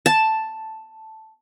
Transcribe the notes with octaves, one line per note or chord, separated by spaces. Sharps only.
A5